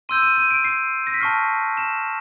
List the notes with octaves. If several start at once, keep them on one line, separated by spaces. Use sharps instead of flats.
C6 E6 G6 D#7
D#7
D#7
D7
C7
A#6
B6
A5 C#6 F6 C7
E7